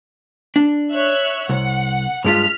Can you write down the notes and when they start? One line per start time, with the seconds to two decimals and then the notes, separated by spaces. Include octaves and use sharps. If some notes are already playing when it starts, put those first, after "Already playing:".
0.56 D4
0.91 C#5 E5 F#6
1.49 C2 F#5
2.24 G2 G#3 F4 F6 B6